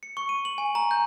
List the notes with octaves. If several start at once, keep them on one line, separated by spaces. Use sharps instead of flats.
C#7
C#6
D#7
F#7
G#5
A#5
G6